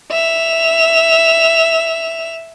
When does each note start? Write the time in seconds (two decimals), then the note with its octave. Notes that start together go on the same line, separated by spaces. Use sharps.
0.11 E5 F7